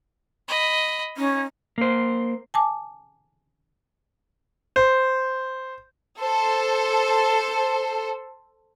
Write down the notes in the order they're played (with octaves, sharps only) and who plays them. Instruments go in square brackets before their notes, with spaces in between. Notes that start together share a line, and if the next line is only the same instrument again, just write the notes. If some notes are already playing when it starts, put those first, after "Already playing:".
[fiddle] D#5 B5
[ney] C#4 [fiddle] D#4
[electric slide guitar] A#3 C5
[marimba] G#5 A5 D6
[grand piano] C5
[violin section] A4 C5